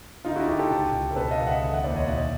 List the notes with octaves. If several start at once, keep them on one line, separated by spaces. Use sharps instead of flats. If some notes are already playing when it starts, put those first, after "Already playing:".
D2 D#4 F4
E4 F#4
D2 F4 G4
G4 A4
C#2
C#2
A#4
B2 A4 B4
D#5 F5
C#2
E5 F#5
D#3
E5 F#5
D#2 C5 D5
C#5 D#5
B2 D5 E5